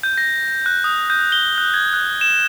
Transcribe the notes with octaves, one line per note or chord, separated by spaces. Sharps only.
G6
A#6
F#6
D#6
G6
G7
F#6
G#6
F#6
E7